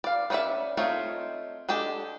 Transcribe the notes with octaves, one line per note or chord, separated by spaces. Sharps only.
D5 F5
B3 C#4 C#5 D5 E5
A3 C4 D#4 F4 C#5
G#3 D4 G4 A4